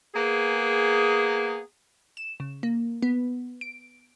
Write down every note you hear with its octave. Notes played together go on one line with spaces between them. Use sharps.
A#3 B3 G#4
E7
C#3
A#3
B3
D7